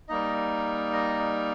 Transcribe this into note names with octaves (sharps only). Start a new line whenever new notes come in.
G3 A#3 D#4 D#5
D#5